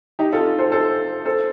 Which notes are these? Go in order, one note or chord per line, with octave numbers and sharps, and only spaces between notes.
D#4 G4
F4 A4
A4 C5
A4 C5
A4 C5